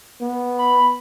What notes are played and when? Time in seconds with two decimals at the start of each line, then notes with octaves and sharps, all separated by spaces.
0.22 B3
0.59 B5